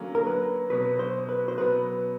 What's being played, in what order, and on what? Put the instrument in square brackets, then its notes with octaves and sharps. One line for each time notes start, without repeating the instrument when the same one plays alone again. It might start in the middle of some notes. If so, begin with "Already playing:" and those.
Already playing: [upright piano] D3 F#3 A#3 C#4
[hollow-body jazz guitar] A#4
B4
[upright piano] B2 F#3 B3 [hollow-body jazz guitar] B4
[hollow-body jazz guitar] C5
B4
C5
[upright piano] B2 F#3 B3 [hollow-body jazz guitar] B4